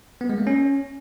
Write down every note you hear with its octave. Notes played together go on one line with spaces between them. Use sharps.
B3
G#3
A#3
C#4